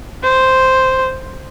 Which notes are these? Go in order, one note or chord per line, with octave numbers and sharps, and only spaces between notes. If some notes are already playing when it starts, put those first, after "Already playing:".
C5